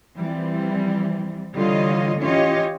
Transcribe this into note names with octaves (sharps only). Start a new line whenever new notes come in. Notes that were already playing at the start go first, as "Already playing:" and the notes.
E3 F3 G3 C4
D3 E3 G3 F4 C#5 D#5
E3 C#4 F4 G4 C#5 D#5